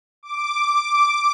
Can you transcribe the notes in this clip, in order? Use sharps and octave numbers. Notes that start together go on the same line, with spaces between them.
D6